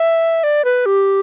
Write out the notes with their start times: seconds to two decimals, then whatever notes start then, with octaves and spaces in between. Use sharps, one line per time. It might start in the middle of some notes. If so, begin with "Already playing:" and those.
Already playing: E5
0.44 D5
0.65 B4
0.86 G4